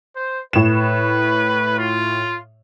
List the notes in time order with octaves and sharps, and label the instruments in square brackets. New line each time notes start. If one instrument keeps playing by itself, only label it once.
[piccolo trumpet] C5
[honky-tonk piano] A2 E7 [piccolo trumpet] B4
[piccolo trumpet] F4